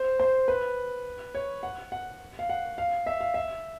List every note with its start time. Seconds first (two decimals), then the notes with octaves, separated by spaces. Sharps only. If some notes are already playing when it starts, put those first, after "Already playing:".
Already playing: C5
0.20 C5
0.48 B4
1.35 C#5
1.63 F#5
1.92 F#5
2.39 F5
2.49 F#5
2.78 F5
3.06 E5
3.21 F5
3.34 E5